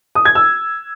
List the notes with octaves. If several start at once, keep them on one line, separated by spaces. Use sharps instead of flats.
D#6
G#6
E6